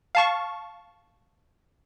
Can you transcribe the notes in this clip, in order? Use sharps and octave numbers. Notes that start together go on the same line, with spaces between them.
F5 A5 C#6